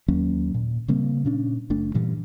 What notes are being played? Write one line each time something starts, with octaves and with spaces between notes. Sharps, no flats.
D#2 F#3 A#3 C#4
A#2
C#3 G3 A#3 C4
A#2 C#4 D4
F#1 A3 D4
G2 A#2 E3